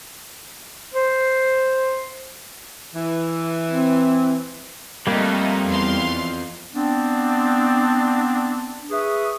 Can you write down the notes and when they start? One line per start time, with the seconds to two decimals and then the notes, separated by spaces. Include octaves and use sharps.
0.94 C5
2.95 E3
3.68 C4
5.07 F2 G3 A3 A#3 D#4
5.66 E2 F5 C6
6.74 B3 C4 D4
8.91 G#4 B4 E5 C#6 D#6